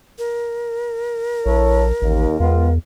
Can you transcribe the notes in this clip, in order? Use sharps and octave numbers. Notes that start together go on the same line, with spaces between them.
A#4
A#1 E4 A4 C#5
A1 D#2
E2 G#3 B3 F4